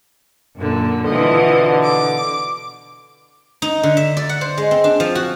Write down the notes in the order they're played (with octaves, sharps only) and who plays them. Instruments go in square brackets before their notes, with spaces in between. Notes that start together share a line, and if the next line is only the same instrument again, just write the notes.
[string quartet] F#2 A#2 D3
[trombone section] B2 D3 [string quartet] E3 F3 D#5
[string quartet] D6
[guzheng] D#4
D3
E5
D5
F#5
C5
G#3
C4
D4
F3
F#4